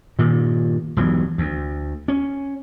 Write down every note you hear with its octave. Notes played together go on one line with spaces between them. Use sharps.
G2 A#2 D#3
E1 B1 G2 E3
D2
C#4